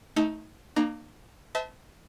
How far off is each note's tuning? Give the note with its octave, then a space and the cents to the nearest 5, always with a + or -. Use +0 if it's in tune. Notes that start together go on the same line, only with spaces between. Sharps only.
A3 +0 D#4 +20 A4 +0
A#3 +0 D#4 -45 A#5 +20
C5 -45 E5 -35 A5 -5